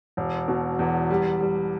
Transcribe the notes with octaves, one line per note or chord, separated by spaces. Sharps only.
E1
B2
E2
G3
G3